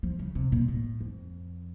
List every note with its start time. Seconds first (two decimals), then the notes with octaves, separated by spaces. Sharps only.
0.03 F3
0.19 C#3
0.35 C3
0.52 A#2
0.68 A2
1.01 F2